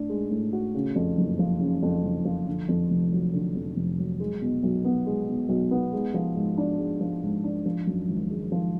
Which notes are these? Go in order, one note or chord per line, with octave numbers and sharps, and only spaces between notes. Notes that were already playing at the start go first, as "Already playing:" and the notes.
Already playing: A2 D4
G#3
A2
F#4
C#3
F2
F#1
F3
C#3
F2
F#1
F3
D3
F2
F1
F#3
D3
F2
F1
F#3
G#3
B2
B1
B3
G#3
B2
B1
B3
G#3
F3
G#2
D4
G#3
F3
G#2
D4
F3
F#2
G#1
G#3
F3